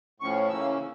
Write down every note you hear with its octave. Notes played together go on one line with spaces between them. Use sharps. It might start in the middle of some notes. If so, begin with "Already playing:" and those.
A2 F3 C#4 C#6
C#3 E3 A#3 C#4 E6